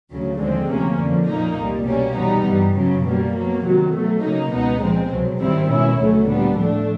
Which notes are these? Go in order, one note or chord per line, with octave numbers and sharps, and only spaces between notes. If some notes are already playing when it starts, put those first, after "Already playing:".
D2 C#3 F#3
D#2 D3 F3 G#3 C4
D2 C3 F3 A#3 C#4
F2 D3 F3
A#2 F3 A#3 D#4
C2 A#2 G3
B2 G3 A#3 C#4
E2 B2 G3 B3 D#4
G2 E3 G3
F#2 C#3 F#3
B2 G3 A#3
B2 F#3 A#3
C3 D#3 F#3
B2 F#3 A3
C#3 F#3 A#3 D#4
C#2 B2 G#3 B3 D#4
A#2 F3 G#3 C4
C2 B2 F#3
G#2 D#3 G3 C4 E4
B2 G#3 C#4 E4
D2 C#3 F#3 A3 C#4
A#2 G3 B3 D4
A2 F3 A3 D4